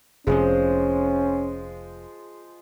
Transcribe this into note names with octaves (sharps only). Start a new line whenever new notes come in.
F1 C3 F3 G#3 C#4 G#4 C5